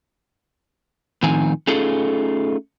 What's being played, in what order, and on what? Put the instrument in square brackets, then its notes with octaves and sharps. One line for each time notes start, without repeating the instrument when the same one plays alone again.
[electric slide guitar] A2 D#3 F3 C4 D#4 G#5
A3 C#4 D#4 F4 G#4 A4